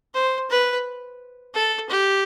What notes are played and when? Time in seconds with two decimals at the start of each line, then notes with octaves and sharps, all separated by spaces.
0.14 C5
0.50 B4
1.55 A4
1.90 G4